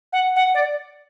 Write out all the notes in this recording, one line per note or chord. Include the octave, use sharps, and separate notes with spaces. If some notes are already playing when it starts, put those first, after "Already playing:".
F#5
F#5
D5